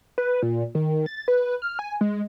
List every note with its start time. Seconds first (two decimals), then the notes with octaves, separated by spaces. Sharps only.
0.18 B4
0.42 A#2
0.75 D#3
1.06 A6
1.28 B4
1.62 F6
1.79 G#5
2.01 G#3